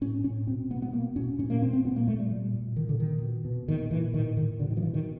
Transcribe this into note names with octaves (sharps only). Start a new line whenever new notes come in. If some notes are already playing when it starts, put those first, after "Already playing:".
A2 C#4
A2 C#4
B2 C4
B2 B3
B3
B2 A#3
B2 C#4
A#2 C#4
A#3
A#2 C4
C4
A#2 B3
A#3
A#2 A3
G3
A#2 G3
A#2
A#2 D#3
D3
A#2 D#3
B2
B2
A#2 D#3
A#2 E3
A2 D#3
A2 D#3
B2 D3
D#3
F3
B2 E3
D#3